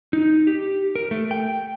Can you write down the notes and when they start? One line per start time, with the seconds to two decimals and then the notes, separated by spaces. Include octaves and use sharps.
0.13 D#4
0.47 G4
0.96 A#4
1.11 A3
1.31 G5